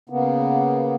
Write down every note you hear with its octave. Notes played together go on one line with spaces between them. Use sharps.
C#3 A#3 B3